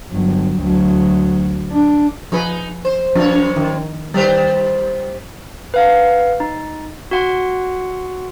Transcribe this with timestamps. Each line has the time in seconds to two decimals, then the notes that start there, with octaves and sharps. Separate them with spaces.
0.12 G1 F#3
0.60 D2 F#3
1.71 D4
2.32 F3 D#4 G#4 B4
2.85 C5
3.15 F#2 F3 D4 C#5
3.56 D#3
4.14 D#3 G3 G4 C5
5.74 B4 F5 F#5
6.40 D#4
7.11 F#4 F#5 C6